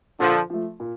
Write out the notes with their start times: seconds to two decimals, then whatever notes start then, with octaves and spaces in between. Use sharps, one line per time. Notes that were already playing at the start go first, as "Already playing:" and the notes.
0.19 A#2 D3 F3
0.50 F3 A3
0.80 A#2